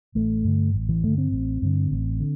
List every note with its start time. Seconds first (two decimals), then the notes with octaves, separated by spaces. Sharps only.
0.15 A1 A3
0.44 G2 D3
0.74 A1
0.89 E3
1.03 G2 D3 A3
1.18 C4
1.32 A1
1.62 G2 D3
1.91 A1
2.20 D3